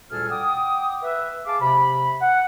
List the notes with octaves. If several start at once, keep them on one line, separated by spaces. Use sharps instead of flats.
D2 A#2 G3 G#4 A4 F6
F#5 G5 D6 D#6
B4 E5
G#4 F5 A5 D6
C3 B5
F#5